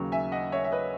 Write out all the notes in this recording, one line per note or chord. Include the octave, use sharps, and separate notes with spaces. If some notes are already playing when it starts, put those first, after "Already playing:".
Already playing: D#2 C#3 F#3
E5 G#5
D#5 F#5
C#5 E5
E5
B4 D#5